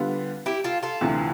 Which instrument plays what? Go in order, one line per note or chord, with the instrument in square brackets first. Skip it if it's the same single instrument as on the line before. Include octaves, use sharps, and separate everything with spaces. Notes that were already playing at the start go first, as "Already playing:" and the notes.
Already playing: [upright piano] D3 G3 B3 F4
[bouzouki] E4 G4
F4 A4
F4 A4
[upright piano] D2 C3 E3